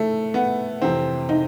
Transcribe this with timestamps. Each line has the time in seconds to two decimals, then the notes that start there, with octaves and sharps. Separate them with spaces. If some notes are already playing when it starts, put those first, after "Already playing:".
Already playing: A2 A3
0.34 B3
0.82 F2 C3 E3 C4
1.29 D#4